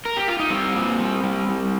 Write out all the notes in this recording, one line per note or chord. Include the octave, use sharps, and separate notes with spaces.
A#4
G4
F4
D#4
G3 C4
A#2
G3
G3
G3